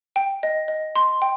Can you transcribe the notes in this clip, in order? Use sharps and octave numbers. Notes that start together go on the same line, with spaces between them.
G5
D#5
D#5
C6
G5